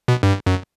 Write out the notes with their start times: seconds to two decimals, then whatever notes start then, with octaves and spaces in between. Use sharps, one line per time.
0.08 B2
0.23 G2
0.46 F#2